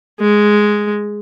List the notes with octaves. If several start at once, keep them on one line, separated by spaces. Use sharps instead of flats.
G#3